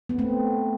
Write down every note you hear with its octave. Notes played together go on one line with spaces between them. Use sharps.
B3
A3 C4